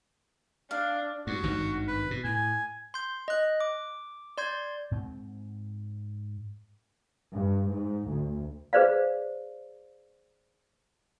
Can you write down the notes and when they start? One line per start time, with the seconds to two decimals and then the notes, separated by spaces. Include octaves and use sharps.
0.71 D4 F5
1.27 G2 F#4
1.44 G#1 G2 D#3
1.88 B4
2.11 B2
2.24 A2 G#5
2.94 C6 G6
3.28 D#5 F#6
3.60 D6
4.38 D5 C6 G6 G#6
4.91 G#2 C4
7.32 G2
7.70 G#2
8.09 D2
8.73 G#4 B4 C5 D5 F5